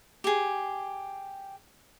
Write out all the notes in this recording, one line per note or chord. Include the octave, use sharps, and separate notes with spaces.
G4 G#4